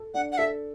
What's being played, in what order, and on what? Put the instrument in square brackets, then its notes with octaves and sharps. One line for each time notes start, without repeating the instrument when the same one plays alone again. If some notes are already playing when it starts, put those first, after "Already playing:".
Already playing: [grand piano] A4
[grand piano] D4 [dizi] F#5
[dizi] F#5
[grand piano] A4 [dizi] E5